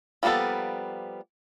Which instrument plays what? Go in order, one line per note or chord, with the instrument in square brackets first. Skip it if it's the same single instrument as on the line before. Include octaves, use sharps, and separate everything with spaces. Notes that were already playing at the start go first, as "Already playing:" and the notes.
[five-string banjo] F3 G3 A#3 B3 A4